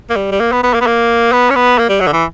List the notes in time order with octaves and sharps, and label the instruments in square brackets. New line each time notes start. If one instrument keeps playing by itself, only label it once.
[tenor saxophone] A#3
G3
G3
A#3
B3
B3
A#3
B3
A#3
B3
C#4
B3
A#3
G3
F#3
D3
E3